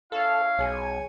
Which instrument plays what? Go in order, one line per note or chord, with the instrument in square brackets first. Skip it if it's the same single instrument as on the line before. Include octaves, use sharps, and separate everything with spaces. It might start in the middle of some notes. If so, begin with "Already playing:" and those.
[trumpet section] C#4 E4 F5 [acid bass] A4
[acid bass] B1 [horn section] G#4 C#5 G#5